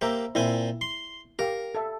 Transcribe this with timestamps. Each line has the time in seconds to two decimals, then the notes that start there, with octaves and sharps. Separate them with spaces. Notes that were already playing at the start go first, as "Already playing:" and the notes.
0.01 A#3 G4 C5 E5 A#5
0.35 A#2 C4 E4 G#5
0.81 C6
1.39 G4 A#4 F5
1.75 A4 E5